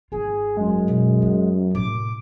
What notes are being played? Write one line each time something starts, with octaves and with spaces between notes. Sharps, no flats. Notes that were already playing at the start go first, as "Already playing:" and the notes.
G#1 F4 G#4
F#2 G#3
B2 E3
B3
A2 C3 D6